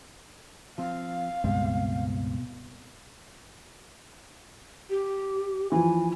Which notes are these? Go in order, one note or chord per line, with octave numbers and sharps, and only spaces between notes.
F3 C4 F5
C#2 G2 B2 G#3 C4 G4
G4
E3 F3 G#5